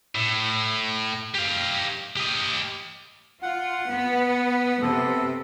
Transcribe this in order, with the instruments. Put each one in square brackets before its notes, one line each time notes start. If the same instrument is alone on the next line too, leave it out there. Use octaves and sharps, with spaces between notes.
[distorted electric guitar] A2
G4 F5
G4 D#5
[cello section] F4 [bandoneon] F#5
[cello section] B3
[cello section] C3 [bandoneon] B3 A4